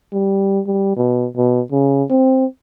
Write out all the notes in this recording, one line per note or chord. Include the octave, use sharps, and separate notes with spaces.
G3
G3
B2
B2
C#3
C4